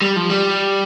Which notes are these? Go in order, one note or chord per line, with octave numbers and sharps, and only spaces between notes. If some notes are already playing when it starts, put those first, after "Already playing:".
G3
F3
G3